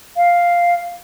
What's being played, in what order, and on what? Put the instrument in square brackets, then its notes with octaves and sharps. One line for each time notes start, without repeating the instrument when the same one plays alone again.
[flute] F5